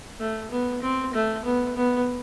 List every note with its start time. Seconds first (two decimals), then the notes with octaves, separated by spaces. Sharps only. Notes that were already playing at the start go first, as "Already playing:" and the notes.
0.20 A3
0.51 B3
0.82 C4
1.14 A3
1.45 B3
1.76 B3